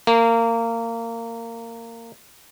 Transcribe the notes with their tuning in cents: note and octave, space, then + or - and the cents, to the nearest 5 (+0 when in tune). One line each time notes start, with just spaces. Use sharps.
A#3 -20